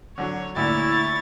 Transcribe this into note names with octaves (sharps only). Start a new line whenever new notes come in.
D3 F#3 C#5
D2 A#2 E4 C#5 A6